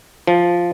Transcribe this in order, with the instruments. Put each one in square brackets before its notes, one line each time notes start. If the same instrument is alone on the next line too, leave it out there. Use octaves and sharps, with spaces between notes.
[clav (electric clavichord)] F3